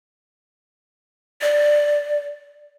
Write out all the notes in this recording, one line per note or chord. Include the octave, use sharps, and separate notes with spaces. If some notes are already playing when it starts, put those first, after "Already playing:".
D5